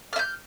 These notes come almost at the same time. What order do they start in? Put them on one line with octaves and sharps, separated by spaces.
F6 E5 G6